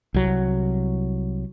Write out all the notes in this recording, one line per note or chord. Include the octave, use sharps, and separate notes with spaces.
C2 F#3